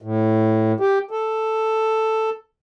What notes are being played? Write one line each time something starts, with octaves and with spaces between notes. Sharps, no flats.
A2
G4
A4